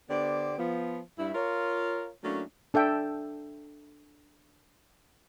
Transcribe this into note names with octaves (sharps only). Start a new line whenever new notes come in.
D3 B3 G4 C5 D5
F3 B3
G2 E4
F4 A#4 C#5
F#3 A3 A#3 C#4 D4 E4
D4 A4 E5 G5